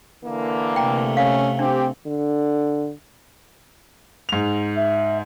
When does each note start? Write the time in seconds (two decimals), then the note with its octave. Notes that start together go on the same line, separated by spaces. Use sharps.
0.23 D3 E3 A#3
0.76 C3 A3 G5 A#5
1.17 C#4 F5
1.59 C4 D4 G4
2.06 D3
4.29 G#2 F7
4.76 E5